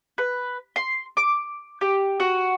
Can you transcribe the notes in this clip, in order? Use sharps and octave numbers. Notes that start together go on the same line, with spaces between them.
B4
C6
D6
G4
F#4